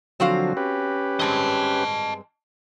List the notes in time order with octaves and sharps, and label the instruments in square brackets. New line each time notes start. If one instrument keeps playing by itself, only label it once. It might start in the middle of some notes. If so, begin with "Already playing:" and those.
[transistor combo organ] D3 F3 F#3 [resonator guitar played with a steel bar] C4 F#4 F5
[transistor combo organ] C#4 G4 B4
[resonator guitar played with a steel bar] G2 G#3 C4 [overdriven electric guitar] D#5 A5